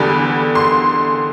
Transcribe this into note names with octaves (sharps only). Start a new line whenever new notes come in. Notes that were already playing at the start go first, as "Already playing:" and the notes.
Already playing: E2 D3 G3 B5
C6